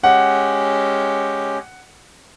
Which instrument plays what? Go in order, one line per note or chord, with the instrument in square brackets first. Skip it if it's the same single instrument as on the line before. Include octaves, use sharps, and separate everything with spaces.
[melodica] G#3 C#4 G4 [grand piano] F#5